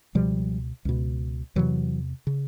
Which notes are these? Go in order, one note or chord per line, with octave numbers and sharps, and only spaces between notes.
C#2 B2 F3 G3
C#2 B2
E2 C3 E3 F#3
C#3